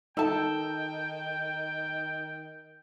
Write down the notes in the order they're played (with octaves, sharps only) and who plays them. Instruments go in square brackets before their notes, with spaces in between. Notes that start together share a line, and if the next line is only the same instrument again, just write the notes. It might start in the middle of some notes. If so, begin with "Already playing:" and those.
[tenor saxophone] D#3 [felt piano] D#4 [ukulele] A4 A5 [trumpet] G5